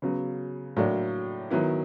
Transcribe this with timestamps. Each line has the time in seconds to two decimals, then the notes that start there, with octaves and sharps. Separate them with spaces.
0.02 C#3 F#3 B3
0.77 A2 F#3 A#3 D4
1.50 D#3 F#3 B3 E4